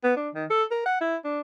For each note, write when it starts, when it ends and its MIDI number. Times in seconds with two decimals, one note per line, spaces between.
0.03 0.15 59
0.17 0.29 62
0.35 0.45 51
0.50 0.63 69
0.71 0.82 70
0.86 0.98 78
1.01 1.17 64
1.24 1.40 62